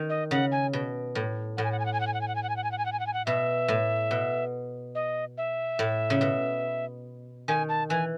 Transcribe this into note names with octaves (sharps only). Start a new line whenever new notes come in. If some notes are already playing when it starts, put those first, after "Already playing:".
Already playing: D#3
D#5
C#3 F#5
G#5
B2
A2
A2 F#5
G#5
F#5
G#5
F#5
G#5
F#5
G#5
F#5
G#5
F#5
G#5
F#5
G#5
F#5
G#5
F#5
G#5
F#5
G#5
F#5
G#5
F#5
B2 E5
A2
B2
D#5
E5
A2
C#3
B2
D#3 G#5
A5
E3 G#5